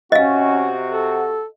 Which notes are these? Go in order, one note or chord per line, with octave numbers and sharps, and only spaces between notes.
C3 C#4 F#4 D#5 F5
A4